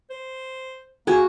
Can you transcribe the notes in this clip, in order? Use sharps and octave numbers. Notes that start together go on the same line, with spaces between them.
C5
A#3 F#4 G#4 G#5